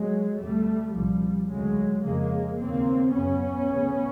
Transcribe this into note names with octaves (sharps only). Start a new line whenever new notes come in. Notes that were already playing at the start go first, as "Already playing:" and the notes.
Already playing: F#3 G#3
D2 C3 G3 A3
C2 A#2 F3 G3
D2 C#3 F#3 G#3
F2 C#3 G#3 A#3
D#2 C#3 A#3 C4
F#2 C#3 B3 C#4
D2 C#3